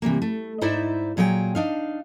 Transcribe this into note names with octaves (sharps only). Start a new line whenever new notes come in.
C3 E3 G3 A#3
A3
G#2 D#4 E4 C5 D5 E5
A#2 F#3 G#4 B4 G5
D4 D#4 F5